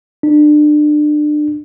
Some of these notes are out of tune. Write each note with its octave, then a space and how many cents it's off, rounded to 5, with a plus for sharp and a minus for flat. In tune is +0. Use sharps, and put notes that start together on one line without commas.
D4 +30